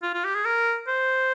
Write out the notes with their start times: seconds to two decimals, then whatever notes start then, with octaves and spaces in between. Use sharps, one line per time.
0.03 F4
0.14 F4
0.24 G4
0.35 G#4
0.45 A#4
0.88 C5